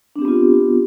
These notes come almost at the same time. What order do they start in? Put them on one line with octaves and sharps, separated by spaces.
D4 C4 G4 B3 F4